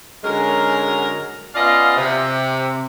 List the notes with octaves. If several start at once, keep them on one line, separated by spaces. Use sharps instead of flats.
D3 F#3 G#3 C#4 A#4
B3 C#4 F4 D5 D#5 F5
C3